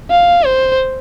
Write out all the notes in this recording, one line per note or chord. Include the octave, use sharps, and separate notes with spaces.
F5
C5